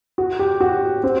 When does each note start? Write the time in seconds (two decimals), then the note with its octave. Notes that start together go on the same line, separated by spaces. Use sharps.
0.18 F#4
0.39 G4
0.61 F#4
1.03 C4